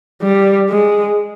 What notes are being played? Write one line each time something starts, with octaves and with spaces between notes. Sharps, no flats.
G3
G#3